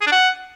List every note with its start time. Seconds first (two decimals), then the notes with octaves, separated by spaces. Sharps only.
0.02 G#4
0.07 D4
0.12 F#5